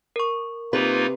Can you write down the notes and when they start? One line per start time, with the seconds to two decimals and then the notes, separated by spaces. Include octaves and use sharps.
0.16 A#4 C#6
0.73 C3 A#3 D#4 F4 B4